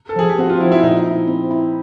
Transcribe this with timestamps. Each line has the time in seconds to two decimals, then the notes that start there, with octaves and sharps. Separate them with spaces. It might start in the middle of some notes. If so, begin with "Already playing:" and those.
0.09 A4
0.16 F3 G#4
0.29 G4
0.38 C4 F#4
0.50 F4
0.60 F3 E4
0.72 E4
0.83 A#2 D#4
1.06 E4
1.27 C4
1.51 E4